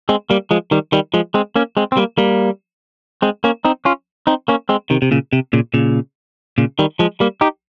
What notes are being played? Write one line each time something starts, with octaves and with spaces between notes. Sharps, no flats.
G#3 C4
G3 A#3
F3 G#3
D#3 G3
D#3 G3
F3 G#3
G#3 C4
A#3 C#4
G#3 C4
C4
G3 A#3
G3 A#3
G#3 C4
A#3 C#4
C4 D#4
C#4 F4
C4 D#4
A#3 C#4
G#3 C4
C3 D#3
C3
A#2 C#3
C3
A#2 C#3
A#2 C#3
A#2 C#3
D#3 G3
F3 G#3
G3 A#3
D#4 G4